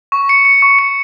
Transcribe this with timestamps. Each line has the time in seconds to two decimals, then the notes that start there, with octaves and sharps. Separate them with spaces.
0.12 C#6
0.29 C#7
0.45 C#7
0.62 C#6
0.79 C#7